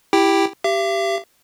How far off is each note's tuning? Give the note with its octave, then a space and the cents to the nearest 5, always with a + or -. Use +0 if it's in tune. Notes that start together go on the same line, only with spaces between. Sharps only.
E4 +0 G4 +10 G5 +0
G4 +0 E5 +45